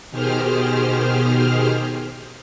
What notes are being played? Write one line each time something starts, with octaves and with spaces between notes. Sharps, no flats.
B2 D#3 G4 G#4 C5 F6